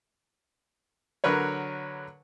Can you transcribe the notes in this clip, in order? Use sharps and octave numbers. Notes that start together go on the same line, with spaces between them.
D3 F#3 A#4 B4 C#5